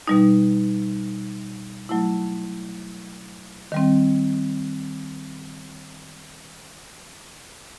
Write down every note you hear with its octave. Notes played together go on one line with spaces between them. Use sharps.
B2 G3 D#4
F#3 A3 E4
D#3 G3 C4